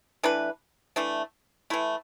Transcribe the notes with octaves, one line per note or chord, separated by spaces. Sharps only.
E3 A3 D4 B4
E3 A3 D4
E3 A3 E4